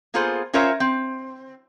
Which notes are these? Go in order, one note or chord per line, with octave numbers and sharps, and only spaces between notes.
A#3 B3 F4 G#4 A4 C5
C#4 F4 A#4 C5 C#5 E5
C4